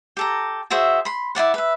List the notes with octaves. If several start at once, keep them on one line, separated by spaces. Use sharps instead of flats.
G4 A4 A#5
F#4 G#4 C5 E5
B5 C6
E4 F#4 D5 F#5
B4 E5